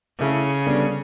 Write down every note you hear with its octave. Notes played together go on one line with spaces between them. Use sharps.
C#3 A3 E4 A4
D3 G3 B3 D4